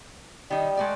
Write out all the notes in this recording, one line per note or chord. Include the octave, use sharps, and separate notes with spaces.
D#3 G3 D#4
G#3 A3 D5